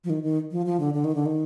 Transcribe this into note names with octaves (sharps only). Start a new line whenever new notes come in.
F3
D#3
D#3
F3
F3
D3
D3
D#3
D3
D#3